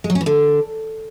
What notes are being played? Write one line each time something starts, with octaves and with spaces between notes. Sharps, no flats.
G#3
F#3
C#4
E3
D3